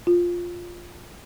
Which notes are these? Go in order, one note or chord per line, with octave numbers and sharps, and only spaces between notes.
F4